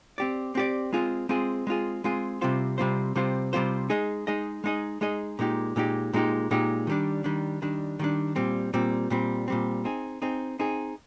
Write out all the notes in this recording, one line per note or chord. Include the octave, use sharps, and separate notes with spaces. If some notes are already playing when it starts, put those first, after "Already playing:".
C4 G4 D5
C4 G4 D5
G#3 C4 F4 G#4
G#3 C4 F4 G#4
G#3 C4 F4 G#4
G#3 C4 F4 G#4
C3 G3 C4 F4 C5
C3 G3 C4 F4 C5
C3 G3 C4 F4 C5
C3 G3 C4 F4 C5
G#3 D#4 G#4 D#5
G#3 D#4 G#4 D#5
G#3 D#4 G#4 D#5
G#3 D#4 G#4 D#5
A#2 G#3 D#4 G4
A#2 G#3 D#4 G4
A#2 G#3 D#4 G4
A#2 G#3 D#4 G4
D#3 G3 D4
D#3 G3 D4
D#3 G3 D4
D#3 G3 D4
A#2 G3 C4
A#2 G3 C4
A#2 G3 C4
A#2 G3 C4
C4 D#4 G#4
C4 D#4 G#4
C4 D#4 G#4